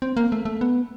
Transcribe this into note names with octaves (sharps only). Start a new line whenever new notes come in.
C4
A#3
A3
A3
B3